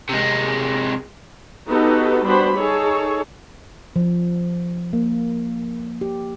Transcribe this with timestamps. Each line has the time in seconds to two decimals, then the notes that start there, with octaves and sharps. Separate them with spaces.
0.09 C3 G#3
1.67 B3 D#4 F#4 G4 A4 B4
2.24 G3 B3 D4 F#4 C5 B5
2.56 D#4 G#4 A4 C#5
3.96 F3
4.93 A#3
6.01 G4